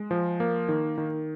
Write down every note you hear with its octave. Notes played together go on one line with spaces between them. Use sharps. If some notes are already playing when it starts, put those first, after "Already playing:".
Already playing: G#3
F3
A#3
D#3
D#3